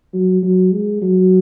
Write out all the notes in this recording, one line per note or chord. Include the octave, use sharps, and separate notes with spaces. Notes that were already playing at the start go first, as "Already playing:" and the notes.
F#3
F#3
G#3
F#3